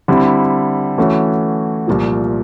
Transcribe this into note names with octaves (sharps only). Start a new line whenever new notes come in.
D3 G3 C4 E4
E3 A3 C#4 F#4
C2 A#2 F3